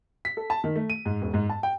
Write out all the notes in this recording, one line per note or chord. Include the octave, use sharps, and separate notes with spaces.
B6
A4
A5
D#3
A3
D#7
G#2
E1
G#2
A5
G5